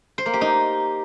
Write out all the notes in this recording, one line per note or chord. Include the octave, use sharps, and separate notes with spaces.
C5
A#3
G4
D#4